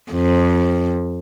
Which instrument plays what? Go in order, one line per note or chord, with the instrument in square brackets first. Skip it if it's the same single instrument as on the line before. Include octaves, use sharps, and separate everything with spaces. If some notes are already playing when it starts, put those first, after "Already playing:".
[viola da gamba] F2